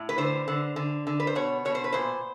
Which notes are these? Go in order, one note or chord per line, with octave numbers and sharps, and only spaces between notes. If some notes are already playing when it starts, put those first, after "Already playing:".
Already playing: A2
B4
D3 C5
D3
D3
D3
B4
C5
B2 C#5
B2 C#5
C5
B4
A#2 C5